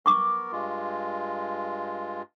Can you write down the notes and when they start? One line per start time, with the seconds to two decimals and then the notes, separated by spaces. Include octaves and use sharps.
0.06 B3 A#4 C#6 D6
0.52 G2 G#3 F4